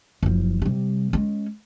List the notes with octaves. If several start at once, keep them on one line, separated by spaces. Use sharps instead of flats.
F#1 F3
C3 G3
G#3 C#4